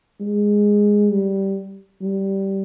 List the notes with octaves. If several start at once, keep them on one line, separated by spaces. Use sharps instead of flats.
G#3
G3
G3